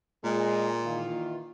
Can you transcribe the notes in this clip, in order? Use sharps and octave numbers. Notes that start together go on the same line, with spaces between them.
A#2 G#3
D#3 E3 F4